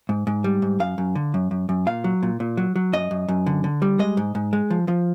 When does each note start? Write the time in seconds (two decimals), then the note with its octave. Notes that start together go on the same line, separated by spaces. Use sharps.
0.09 G#2
0.27 G#2
0.44 G3
0.62 G#2
0.80 F#2 F5
0.98 F#2
1.15 D3
1.34 F#2
1.51 F#2
1.69 F#2
1.87 A#2 F5
2.04 F#3
2.23 A#2
2.40 A#2
2.57 F#3
2.76 F#3
2.93 F#2 D#5
3.11 F#2
3.28 F#2
3.46 D3
3.64 D3
3.82 G3
3.99 G#3 D#5
4.17 G#2
4.35 G#2
4.53 G#3
4.70 F3
4.88 F3